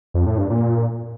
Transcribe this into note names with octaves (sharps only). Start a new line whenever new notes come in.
F2
A2
G2
A#2